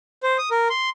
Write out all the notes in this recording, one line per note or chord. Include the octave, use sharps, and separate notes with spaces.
C5
D#6
A#4
C6